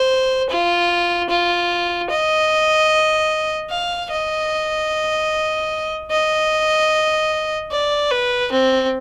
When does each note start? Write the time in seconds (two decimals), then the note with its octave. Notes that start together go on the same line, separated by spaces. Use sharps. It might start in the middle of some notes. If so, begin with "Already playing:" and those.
Already playing: C5
0.50 F4
1.29 F4
2.10 D#5
3.70 F5
4.11 D#5
6.10 D#5
7.72 D5
8.11 B4
8.52 C4